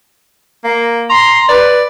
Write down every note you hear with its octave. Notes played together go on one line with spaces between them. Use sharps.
A#3
A#5 C6
B4 D5